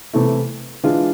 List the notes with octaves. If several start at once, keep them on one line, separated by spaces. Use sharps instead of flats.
C3 E3 A3 E4
E3 G#3 D4 F4